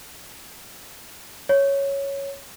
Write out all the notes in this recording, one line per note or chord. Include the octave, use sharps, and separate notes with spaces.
C#5